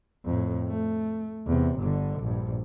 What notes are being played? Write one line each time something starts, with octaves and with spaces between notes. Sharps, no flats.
F2 A2
A3
E2 C3
G1 D3
A#1 G2